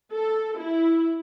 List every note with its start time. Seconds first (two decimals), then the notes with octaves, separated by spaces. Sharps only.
0.13 A4
0.60 E4